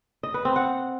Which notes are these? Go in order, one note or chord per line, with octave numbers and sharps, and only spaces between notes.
D#5
B4
C4
F#5